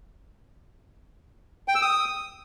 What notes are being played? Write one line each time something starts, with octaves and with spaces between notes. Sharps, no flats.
G5
E6
D#6